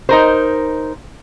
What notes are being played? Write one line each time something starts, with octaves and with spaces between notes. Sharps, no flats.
D#4 A#4 C5